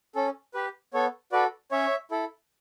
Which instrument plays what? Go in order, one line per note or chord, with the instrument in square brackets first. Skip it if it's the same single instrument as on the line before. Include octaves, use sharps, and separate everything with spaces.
[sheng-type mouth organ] C#4 A4
G4 B4
B3 A4 C#5
F#4 A4 B4 D5
C#4 C#5 E5
E4 A4